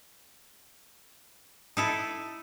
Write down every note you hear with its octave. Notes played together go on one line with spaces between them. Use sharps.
D#4 E4 A4